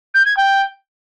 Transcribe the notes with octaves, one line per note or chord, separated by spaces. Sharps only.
G6
G#6
G5